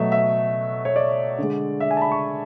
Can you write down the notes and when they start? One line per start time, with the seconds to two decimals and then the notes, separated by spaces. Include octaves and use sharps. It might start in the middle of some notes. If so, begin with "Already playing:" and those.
Already playing: B2 F#3 A3 E5
0.12 E5
0.85 C#5
0.96 D5
1.38 D3 G#3
1.80 E5
1.91 G#5
1.97 A5
2.02 B5
2.12 C#6